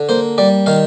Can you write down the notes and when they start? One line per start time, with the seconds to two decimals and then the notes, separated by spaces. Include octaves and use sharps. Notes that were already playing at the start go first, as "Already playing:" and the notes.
Already playing: D3
0.09 A#3 C5
0.38 G3 D5
0.66 D#3 F5